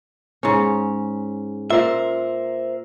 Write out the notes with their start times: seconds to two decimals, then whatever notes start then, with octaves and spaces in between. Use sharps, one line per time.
0.43 G#2 C#4
1.70 A#2 A#4 C5 E5